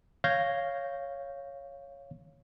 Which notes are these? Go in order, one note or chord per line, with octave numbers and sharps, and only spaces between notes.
C#5 F5 G6 G#6 A#6